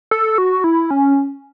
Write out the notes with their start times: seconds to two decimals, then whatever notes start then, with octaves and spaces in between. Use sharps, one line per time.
0.11 A4
0.38 F#4
0.64 E4
0.91 C#4